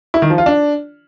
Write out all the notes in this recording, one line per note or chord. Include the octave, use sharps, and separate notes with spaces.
E4
D#3
F3
F4
D4